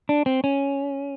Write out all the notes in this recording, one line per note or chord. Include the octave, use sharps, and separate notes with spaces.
D4
C4
C#4